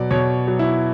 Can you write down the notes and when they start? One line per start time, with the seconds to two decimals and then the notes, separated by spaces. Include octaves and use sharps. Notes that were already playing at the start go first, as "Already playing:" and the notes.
Already playing: B2 F#3 D5
0.11 B2 C#5
0.47 F#3
0.59 E4